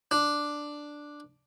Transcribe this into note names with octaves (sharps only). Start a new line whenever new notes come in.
D4